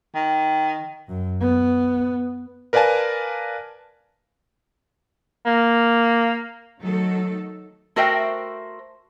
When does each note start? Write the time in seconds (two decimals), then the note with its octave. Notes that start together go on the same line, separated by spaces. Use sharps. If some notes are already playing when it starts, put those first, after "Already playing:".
0.15 D#3
1.09 F#2
1.41 B3
2.73 A#4 B4 D5 F5 G#5 A5
5.46 A#3
6.80 D#3 F#3 A3 D#4 A4
7.96 A3 F#4 A#4 C5 E5 G5